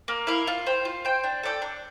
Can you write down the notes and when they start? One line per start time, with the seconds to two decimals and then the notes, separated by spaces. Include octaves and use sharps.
0.08 A#3
0.27 E4 A#4 F5
0.47 F4
0.66 C5 G5
0.85 F4
1.05 C5 G5
1.24 D4
1.43 A4 D5 G5
1.62 D4